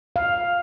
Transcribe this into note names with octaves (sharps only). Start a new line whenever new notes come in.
F5